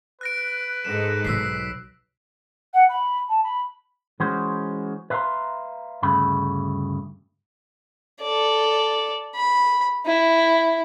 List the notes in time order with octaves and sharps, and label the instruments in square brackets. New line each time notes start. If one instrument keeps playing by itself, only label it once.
[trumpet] B4 [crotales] F#6 A#6 D7
[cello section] G#2 G#3 A4 [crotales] E7
[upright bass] B1 F#3 [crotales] E6 B6 C7
[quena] F#5
B5
A5
B5
[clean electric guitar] E3 G#3 C#4 F#4 C5
B4 E5 F5 A5 A#5 C6
D2 G2 C#3 A3 B5
[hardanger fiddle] A4 D5
B5
E4